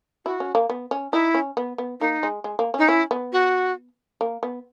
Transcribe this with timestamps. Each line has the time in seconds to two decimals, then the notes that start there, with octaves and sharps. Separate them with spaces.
0.25 E4 F#4
0.40 C#4
0.55 A#3
0.70 B3
0.91 C#4
1.13 D#4 E4
1.34 C#4
1.57 B3
1.78 B3
2.00 A#3 D#4
2.23 G#3
2.44 G#3
2.59 A#3
2.74 C#4 D#4
2.88 C#4 E4
3.11 B3
3.33 F#4
4.21 A#3
4.43 B3